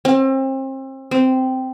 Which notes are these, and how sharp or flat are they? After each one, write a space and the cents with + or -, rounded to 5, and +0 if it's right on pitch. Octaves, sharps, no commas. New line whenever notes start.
C4 +35
C4 -10